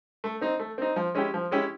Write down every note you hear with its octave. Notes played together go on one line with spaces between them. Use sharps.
A3
C4 D#4
A3
C4 D#4
F3
G#3 C#4 E4 G4
F3
G#3 C#4 E4 G4